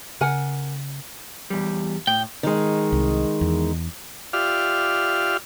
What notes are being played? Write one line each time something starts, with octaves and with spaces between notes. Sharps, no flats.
C#3 A#4 F#5 G#5
E2 G3
A2 G5
D#3 G#3
C2
E2
F4 G4 D5 E5 F5 F6